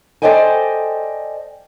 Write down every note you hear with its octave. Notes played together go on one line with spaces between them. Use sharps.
A4 C5 D5 D#5 G5 G#5